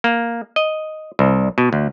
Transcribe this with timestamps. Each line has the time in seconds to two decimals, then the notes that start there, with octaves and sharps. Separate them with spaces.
0.04 A#3
0.56 D#5
1.19 C2
1.58 B2
1.73 D2